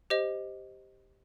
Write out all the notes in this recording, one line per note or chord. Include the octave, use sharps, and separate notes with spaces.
G4 C5 D#5